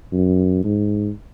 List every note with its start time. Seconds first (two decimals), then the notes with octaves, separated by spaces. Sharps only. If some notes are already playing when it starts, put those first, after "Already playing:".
0.13 F#2
0.64 G#2